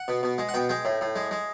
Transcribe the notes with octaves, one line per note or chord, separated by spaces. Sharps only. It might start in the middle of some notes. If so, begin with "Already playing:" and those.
Already playing: F#5
B2
B2
G#3
F#5
B2 G5
G#3 G5
A2
A2
G#3
G#3